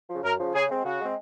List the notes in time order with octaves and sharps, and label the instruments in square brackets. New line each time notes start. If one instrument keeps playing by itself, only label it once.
[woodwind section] C#3 F3
[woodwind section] F#2 [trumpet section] A#4
[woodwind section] C#3 F3
[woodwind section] C#3 [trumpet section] G#4
[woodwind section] G#3 C4
[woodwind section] C#3 [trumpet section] F#4
[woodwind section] G#3 C4